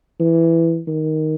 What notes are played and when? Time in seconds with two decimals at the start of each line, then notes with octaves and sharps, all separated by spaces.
0.20 E3
0.87 D#3